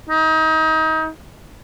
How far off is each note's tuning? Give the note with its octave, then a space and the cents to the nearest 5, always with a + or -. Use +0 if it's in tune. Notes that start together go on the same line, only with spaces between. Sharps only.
D#4 +30